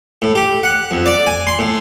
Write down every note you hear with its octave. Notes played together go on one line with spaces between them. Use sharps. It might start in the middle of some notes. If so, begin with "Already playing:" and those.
A2
G4
F#5
F2
D5
G#5
C6
A2